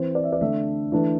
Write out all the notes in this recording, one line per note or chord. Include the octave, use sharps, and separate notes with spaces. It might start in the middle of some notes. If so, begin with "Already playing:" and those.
Already playing: E3 C4 C5
D5
E5
D5
D3 A3 D4 E5
E3 A3 D4